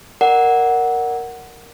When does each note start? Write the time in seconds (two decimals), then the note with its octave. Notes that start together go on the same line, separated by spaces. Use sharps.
0.21 A#4 D5 F#5